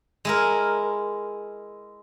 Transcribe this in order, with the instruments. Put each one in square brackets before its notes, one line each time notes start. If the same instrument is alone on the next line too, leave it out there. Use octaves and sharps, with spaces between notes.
[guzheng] G#3 E4 A#4